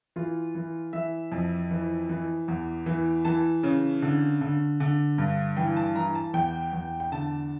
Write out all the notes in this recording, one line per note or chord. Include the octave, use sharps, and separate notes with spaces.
E3 F4
E3
E3 E5
F2
E3
E3
E2
E3
E3 A5
C#3
D3
D3
D3
G2
E3 G5
A5
E3 A#5
A5
E2 G5
E2
G5
D3 A5